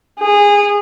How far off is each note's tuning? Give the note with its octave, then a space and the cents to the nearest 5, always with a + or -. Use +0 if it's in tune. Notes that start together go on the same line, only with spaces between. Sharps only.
G#4 -20